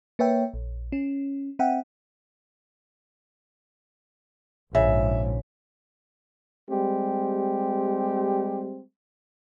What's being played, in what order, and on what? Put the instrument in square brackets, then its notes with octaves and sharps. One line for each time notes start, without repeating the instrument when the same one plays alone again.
[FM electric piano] A#3 B4 C#5 E5 G5
A#1
C#4
C4 E5 F#5 G5
[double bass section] A#1 G#2 [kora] C#3 [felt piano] E5
[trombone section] G3 G#3 C4 G4